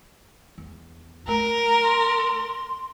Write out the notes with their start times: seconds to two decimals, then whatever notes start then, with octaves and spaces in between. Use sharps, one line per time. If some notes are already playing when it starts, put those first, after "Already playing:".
0.58 E2
1.28 F#3 A3 A#4 A#5
1.82 C6